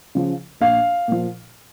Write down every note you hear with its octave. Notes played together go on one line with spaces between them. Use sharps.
C#3 F3
A#1 F5
A#2 F3